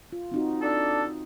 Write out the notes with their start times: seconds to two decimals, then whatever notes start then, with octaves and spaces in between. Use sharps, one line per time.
0.12 F4
0.32 C4 D#4 F#4
0.62 D4 A4